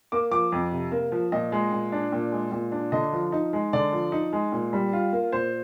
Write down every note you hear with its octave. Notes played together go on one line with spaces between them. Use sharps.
A#3 D6
F3 D6
F2
C3
A#3
F3
A#2 D#5
G#3
A#2
D4
A#2
G#3
A#2
D4
D3 D#5
F3
D#4
G#3
D3 D5
F3
D#4
G#3
A#2
G3
F4
A#3
A#2 C5